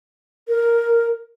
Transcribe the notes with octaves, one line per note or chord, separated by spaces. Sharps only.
A#4